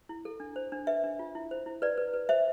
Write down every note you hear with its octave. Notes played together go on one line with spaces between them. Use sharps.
E4
A4
D4
C5
D4
B4 E5
D4
F4
E4
C5
E4
B4 D5
B4
B4
C5 E5